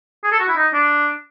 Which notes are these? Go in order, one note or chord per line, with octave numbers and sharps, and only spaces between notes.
G#4
A4
F#4
E4
D#4
D4